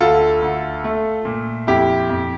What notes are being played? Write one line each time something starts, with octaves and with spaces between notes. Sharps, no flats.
D2 F4 A4
D2
A3
A#2
F2 E4 G4
F2